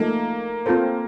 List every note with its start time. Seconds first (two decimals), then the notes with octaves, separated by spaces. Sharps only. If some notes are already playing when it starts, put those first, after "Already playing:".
Already playing: F3 A3 A#3 D#4 A4
0.66 C4 F4 A4 C5